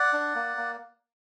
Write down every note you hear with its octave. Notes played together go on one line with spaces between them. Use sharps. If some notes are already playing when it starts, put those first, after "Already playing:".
Already playing: D5 F#5
D4
A#3
A#3